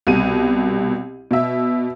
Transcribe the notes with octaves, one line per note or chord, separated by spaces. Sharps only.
C2 B2 D#7
B2 E5